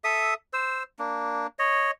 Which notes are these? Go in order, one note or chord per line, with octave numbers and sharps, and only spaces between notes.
A4 E5 D#6
C5 E6
A#3 D4
C#5 D#5